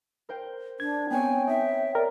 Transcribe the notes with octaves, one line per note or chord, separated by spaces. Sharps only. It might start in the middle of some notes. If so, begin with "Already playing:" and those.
A#4 C5 G5
D4 G#6
B3 C4 C#5 G5 G#5
D#4 E5
A#4 D5